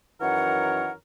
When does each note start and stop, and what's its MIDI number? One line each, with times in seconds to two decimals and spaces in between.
0.21 0.91 42
0.21 0.91 51
0.21 0.91 52
0.21 0.91 70
0.21 0.91 73
0.21 0.91 78